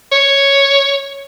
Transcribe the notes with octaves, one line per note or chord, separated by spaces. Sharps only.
C#5